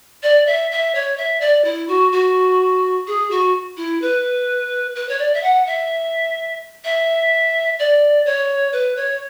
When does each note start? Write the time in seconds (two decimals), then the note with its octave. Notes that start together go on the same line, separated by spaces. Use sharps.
0.23 D5
0.47 E5
0.71 E5
0.95 C#5
1.17 E5
1.41 D5
1.65 E4
1.88 F#4
2.12 F#4
3.07 G#4
3.31 F#4
3.77 E4
4.02 B4
4.95 B4
5.09 C#5
5.19 D5
5.34 E5
5.43 F#5
5.66 E5
6.85 E5
7.79 D5
8.26 C#5
8.73 B4
8.96 C#5